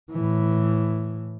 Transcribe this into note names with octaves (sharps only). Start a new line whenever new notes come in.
A2 E3